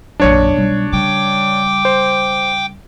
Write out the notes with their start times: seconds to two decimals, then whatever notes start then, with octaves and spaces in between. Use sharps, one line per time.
0.20 A#1 F#2 D4 C#5 C#7
0.56 B1 G3
0.93 C#3 G3 G5 D6
1.85 C5